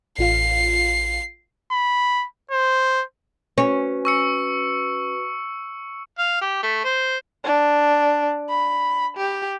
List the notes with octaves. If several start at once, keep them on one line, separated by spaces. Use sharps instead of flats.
A1 F4 F5 C7
B5
C5
C#4 F#4 B4
C#6 E6 C#7
F5
G4
A3
C5
D4
B5
G4